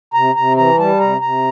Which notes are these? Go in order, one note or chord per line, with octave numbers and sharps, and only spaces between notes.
C3 A#5
C3 A#5
E3 A#5
G3 A5
C3 A#5
C3 A#5